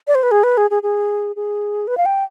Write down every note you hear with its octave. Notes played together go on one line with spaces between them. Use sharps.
D5
C5
B4
G#4
B4
G#4
G#4
G#4
G#4
B4
F5
G5